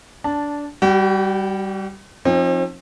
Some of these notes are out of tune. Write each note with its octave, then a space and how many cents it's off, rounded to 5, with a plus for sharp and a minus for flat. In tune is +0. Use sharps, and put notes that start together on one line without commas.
D4 -15 A5 +0
G3 +0 F#4 +45
F3 +10 C4 +40 D#4 +0